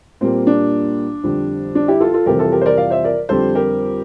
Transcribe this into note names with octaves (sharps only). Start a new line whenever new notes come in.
A#2 G3 A#3 C4
D4
F2 D3 G3
D4
E4 G4
F4 A4
F4 A4
F2 C3 E3 G3 G4 A#4
F4 A4
G4 A#4
C5
A#4 D5
D5 F5
C5 E5
A#4 D5
F2 D3 G3 C4 A4 C5
G4 A#4